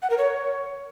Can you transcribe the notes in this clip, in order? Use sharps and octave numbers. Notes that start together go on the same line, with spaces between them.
F#5
A#4
C#5